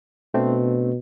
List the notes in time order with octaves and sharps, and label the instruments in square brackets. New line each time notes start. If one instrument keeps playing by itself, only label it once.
[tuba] B2 [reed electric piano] A3 C4 D4